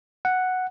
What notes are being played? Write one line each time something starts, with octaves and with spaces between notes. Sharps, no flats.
F#5